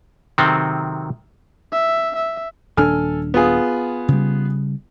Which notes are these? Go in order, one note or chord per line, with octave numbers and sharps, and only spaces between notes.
C3 D#3 F#3 C4 A4
E5
E5
D#1 D4 A4 G#5 F6
B3 F4 G#4
C#3 G3